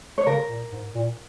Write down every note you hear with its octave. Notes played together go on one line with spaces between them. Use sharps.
C#5
C#3 A#4
A#2
G#2
A#2